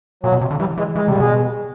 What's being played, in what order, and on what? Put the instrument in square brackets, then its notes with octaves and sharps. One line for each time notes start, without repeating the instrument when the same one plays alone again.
[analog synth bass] A#2 [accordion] F#3
[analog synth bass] B2
C3
D3
[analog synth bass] E3 [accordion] G3
[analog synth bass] E3 [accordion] G#3
[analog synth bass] E3 [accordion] G#3
[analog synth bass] C3 [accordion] G3
[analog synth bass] A#2
[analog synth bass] B2 [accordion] G#3